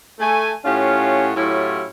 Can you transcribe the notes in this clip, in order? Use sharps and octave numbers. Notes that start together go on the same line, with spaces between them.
A3 G#5
A2 C#4 F4 G4 F5 F#5
A2 F#3 C#4 E4 F4 G4